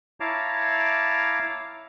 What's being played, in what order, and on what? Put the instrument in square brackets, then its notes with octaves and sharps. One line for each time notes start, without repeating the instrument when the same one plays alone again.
[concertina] E4 C#5 F5 A5 A#5 D6